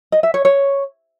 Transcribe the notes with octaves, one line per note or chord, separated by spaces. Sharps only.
D#5
E5
C#5
C#5